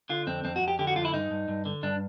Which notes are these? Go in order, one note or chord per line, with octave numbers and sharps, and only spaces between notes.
D3 F4
F2 C4
F2 C4
F#4
F2
G4
D3 G4
F#4
F2 F4
E4
G2 D#4
G2
G2
D3
G2 D4